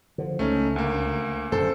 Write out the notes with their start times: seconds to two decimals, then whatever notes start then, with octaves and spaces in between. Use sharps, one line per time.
0.18 D3 F3
0.39 C#2 A3 C#4 D#4
0.76 D2 A#3
1.52 D#1 F#2 D3 A4 C5